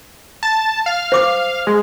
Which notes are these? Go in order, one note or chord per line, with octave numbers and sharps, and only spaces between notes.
A5
F5
C5 D6 D#6
G#3